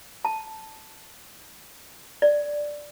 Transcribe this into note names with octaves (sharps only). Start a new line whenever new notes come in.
A5
D5